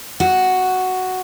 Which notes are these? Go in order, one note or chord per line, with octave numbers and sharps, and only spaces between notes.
F#4